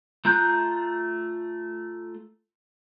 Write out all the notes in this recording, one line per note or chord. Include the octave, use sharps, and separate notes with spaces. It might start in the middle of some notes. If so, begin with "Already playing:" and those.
A3 F4 A#5 F#6 G6